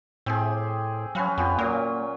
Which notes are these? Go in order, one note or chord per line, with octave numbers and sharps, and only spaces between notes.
A2 C4 G4 G#4
F#3 C#4 B4 F5
F2 B3 F4 G4
A#2 F#3 A#3